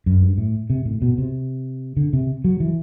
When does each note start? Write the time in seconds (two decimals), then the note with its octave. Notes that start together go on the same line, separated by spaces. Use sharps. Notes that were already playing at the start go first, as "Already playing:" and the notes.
0.06 F#2
0.22 G2
0.38 A2
0.70 C3
0.85 A2
1.02 B2
1.18 C3
1.97 D3
2.13 C3
2.44 F#3
2.60 E3